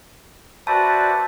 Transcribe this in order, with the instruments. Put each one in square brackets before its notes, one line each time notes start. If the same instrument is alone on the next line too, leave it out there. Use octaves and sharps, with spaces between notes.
[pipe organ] F#4 D5 [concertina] B4 C5 E5 [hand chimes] A5